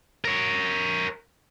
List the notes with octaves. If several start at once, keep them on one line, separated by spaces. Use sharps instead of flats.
A#4 C#5